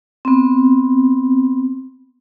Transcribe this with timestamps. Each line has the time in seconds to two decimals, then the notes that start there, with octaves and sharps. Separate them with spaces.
0.25 B3 C4